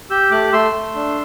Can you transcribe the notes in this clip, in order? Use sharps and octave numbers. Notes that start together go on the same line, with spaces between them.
G4 E6 G6
A3 D6 F#6
A3 C6 E6
A3
D4